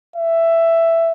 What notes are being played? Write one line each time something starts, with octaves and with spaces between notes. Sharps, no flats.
E5